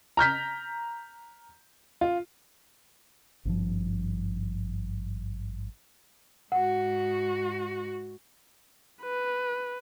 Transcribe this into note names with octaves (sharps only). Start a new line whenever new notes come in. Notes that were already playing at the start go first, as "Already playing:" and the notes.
A#5 F6 G6 B6
F4
G#1 G2 F3
G#2 F#4 F#5
B4